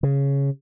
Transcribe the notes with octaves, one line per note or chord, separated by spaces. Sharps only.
C#3